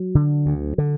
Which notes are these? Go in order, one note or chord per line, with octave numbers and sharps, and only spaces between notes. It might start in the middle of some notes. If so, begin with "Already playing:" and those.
Already playing: F#3
D3
D2
D3